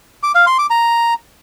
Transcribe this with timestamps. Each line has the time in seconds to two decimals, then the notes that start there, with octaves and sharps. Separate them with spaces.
0.23 D6
0.35 F5
0.47 C6
0.59 D6
0.70 A#5